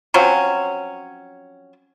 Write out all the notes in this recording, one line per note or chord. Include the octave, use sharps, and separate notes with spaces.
F3 F#3 C4 C#4